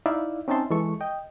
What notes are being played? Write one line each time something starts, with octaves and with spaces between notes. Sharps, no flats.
D#4 E4 D5 E5 F5
C4 C#4 D#4 E5 A5 C6
E3 G#3 A4 C#6
D#5 G5